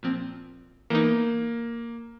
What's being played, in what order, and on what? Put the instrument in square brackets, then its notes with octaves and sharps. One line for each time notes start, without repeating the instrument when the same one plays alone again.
[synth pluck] A#2 F3 C4
[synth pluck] E3 B3 D#4 [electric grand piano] A#3